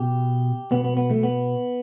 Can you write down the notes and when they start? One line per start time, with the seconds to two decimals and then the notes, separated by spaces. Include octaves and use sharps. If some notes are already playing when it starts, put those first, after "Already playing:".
Already playing: B2 G4
0.71 B2 B3
0.84 B3
0.97 B3
1.11 A3
1.23 B3